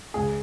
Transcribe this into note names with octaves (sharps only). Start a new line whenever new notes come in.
C#2 G#4